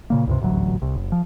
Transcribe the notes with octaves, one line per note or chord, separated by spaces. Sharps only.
A#2 C#3 A#3
C#2 G2 C3
D#1 A1 D2 F#3
C2
F#1
F3